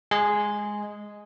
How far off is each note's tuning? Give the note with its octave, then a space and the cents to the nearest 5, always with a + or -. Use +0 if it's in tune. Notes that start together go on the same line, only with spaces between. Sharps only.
G#3 +0 G#4 +0